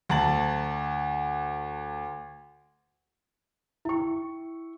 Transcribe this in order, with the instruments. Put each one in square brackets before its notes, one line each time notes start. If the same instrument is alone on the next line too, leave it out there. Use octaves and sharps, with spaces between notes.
[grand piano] D2 A5 A#5 A6 F#7
[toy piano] E4 G5 [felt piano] E5 C#6